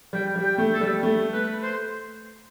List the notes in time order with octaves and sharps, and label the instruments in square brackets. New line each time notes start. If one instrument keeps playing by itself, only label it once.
[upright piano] G3 [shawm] G5
[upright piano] G3
[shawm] G5
[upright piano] A3
[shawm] A4
[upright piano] G3
A3
[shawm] B4
C5